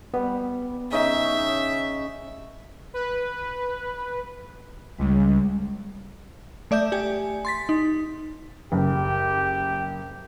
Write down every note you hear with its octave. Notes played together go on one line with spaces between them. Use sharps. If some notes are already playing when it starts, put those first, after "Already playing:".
G3 B3
C#3 C#4 D#4 E5
B4
C#2 G3 G#3
A3 D5 E5 G6
G4 G#5
C6 A6 B6
D#4
F#1 G4